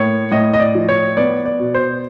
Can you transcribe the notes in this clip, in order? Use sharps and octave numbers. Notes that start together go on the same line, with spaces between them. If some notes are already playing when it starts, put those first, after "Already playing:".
Already playing: A2 A#3 C#5
A2 D#5
D#5
D5
F3
C#5
B3 D5
D5
B2
C5